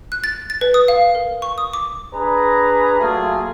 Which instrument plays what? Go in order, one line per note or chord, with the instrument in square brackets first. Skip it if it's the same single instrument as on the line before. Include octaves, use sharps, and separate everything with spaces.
[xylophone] F#6
A6
A6
B4
D#6
F5
A#4
C#6
D#6
D6
[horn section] D4 G#4 B4 A#5
F#3 A3 A#3 F4 G#4